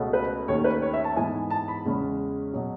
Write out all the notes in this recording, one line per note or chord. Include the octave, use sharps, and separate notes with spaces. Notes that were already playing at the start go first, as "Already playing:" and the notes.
Already playing: C#2 B2 A3 C#4
B4
D#2 D#3 A3 C#4 C#5
B4
C#5
E5
A5
G#2 E3 B3 G#5
A5
B5
E2 C#3 G#3 C#4
B2 F#3